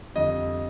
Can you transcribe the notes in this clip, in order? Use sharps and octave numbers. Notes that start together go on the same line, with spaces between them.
F2 D3 G3 D#5